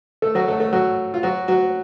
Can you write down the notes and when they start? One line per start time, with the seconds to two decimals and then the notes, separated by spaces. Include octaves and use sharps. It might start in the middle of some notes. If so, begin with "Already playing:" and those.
0.22 A3 A4
0.35 F#3 F#4
0.48 A3 A4
0.60 A3 A4
0.73 F#3 F#4
1.14 F4
1.23 F#3 F#4
1.48 F#3 F#4